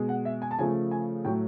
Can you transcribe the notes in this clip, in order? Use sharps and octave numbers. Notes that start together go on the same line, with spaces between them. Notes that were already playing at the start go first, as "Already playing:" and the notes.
Already playing: B2 G#3
F#5
E5
G#5
A5
C#3 F3 A3 G#5
G#5
A2 F#3 A3 G5